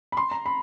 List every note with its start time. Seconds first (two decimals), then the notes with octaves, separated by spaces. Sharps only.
0.12 B5
0.17 C6
0.31 A#5
0.46 B5